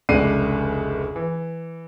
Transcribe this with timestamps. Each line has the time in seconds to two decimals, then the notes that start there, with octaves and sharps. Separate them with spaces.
0.09 F1 C#2 D4 C7 D#7
1.16 E3